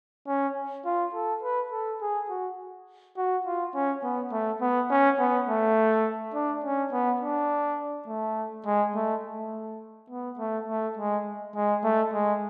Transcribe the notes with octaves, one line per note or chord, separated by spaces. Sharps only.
C#4
F4
A4
B4
A4
G#4
F#4
F#4
F4
C#4
B3
A3
B3
C#4
B3
A3
D4
C#4
B3
D4
A3
G#3
A3
A3
B3
A3
A3
G#3
G#3
A3
G#3